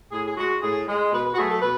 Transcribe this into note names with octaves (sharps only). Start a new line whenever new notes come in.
A2 G#4
G#4
G#3 F#4
A2 G#4
G#3
B2 B4
B4
F#4
F#3 A3 G#4
A4
B2 B4